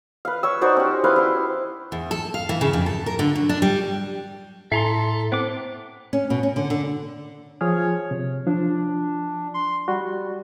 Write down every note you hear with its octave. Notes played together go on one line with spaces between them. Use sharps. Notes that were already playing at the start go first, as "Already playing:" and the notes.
B4 F5
C#5 C#6 E6
D#4 F#4 C5 D5
C#4 G4
E4 B4 C5 F5
E4 C6
E2
A4
F5
E3
C#3
F2
A4
A#4
D3
F#3
D4
G3
A2 E4 A4 E5 G#5 A#5 C6
B3 C4 C5 D6
C#4
B2
C#4
D3
D3
F3 G#4 C#5 F6
C3
F3 D4
C6
G3 F#4